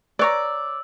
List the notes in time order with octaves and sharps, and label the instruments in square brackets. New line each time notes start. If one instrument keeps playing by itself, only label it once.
[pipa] B4 C#5 A#5 [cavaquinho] D5 [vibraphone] E6